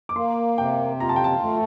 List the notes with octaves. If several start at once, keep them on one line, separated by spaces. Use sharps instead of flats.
D6
A#3 C6
C3 G5
F4 A#5
A5
G5
A5
A3